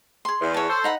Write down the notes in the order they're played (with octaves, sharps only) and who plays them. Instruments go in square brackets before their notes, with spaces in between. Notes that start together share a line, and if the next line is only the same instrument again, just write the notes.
[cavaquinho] G#4 C6
[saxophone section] E2
[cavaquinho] C#5 A5
[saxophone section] A4 C5
[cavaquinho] D#4 F#5 B5